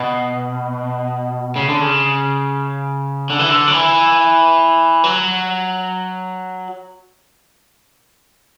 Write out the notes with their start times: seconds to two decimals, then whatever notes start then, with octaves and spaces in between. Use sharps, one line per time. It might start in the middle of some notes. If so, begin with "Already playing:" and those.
Already playing: B2
1.56 C#3
1.69 D3
1.81 C#3
3.30 D3
3.39 E3
3.49 D3
3.68 F#3
3.72 E3
5.04 F#3